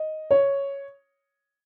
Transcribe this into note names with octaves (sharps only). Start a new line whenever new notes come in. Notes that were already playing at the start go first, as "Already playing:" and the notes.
Already playing: D#5
C#5